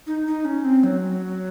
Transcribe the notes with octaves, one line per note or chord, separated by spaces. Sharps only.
D#4
D#4
C#4
C4
F#3